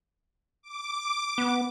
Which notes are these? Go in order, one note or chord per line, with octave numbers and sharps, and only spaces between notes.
D6
B3